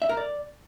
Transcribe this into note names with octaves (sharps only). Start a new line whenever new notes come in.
E5
A#4
D5